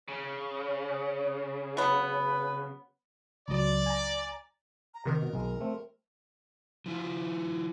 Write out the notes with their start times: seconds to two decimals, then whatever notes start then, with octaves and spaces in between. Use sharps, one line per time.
0.08 C#3 C#5
1.77 F#3 B3 B4
3.48 C#2 F#3 D5
3.86 G#5 A#5
4.94 A#5
5.05 C3 D#3 A#4
5.22 B2
5.33 B1 G#3
5.60 A3 C4
6.86 F3 E4 F4